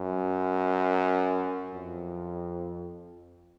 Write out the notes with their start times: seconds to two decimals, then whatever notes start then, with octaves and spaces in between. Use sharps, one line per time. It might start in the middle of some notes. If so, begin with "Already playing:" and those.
Already playing: F#2
1.74 F2